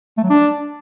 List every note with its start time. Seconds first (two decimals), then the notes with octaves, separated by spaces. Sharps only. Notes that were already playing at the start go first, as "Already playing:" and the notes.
0.18 A3
0.24 F#3
0.30 D4